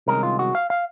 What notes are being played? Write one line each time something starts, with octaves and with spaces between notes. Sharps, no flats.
C2 C3 D#3 G#3 C#4 A#4
F4
F#4
F5
F5